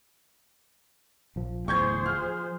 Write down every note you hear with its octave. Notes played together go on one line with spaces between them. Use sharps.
A#1 F3
D1 E2 A2 G#4 C5 C#6 G6 G#6
F3 F6